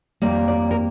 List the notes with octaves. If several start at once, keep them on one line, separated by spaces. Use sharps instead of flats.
F2 D#3 G3 A#3 D5
D5
A#4